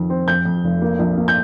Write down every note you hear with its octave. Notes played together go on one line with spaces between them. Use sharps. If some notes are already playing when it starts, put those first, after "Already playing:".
Already playing: F2 D#3
C4
F2 G6
F2
F1
A#3
A#1
A#3
G6